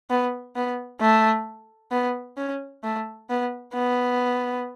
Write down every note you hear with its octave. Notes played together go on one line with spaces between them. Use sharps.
B3
B3
A3
B3
C#4
A3
B3
B3